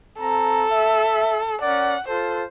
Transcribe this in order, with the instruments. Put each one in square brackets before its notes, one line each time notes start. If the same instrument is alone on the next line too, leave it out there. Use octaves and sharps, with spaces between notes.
[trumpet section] C4 A#5 [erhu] A4
[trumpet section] E5
[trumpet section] C#4 A#4 D5 [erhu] F#5
[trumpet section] F4 A4 [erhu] C5